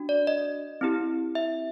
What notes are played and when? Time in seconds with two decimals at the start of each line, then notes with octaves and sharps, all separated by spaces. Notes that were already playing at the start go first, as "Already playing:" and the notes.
Already playing: D4 F#4
0.09 D5
0.27 D#5
0.81 C4 E4 G4
1.35 E5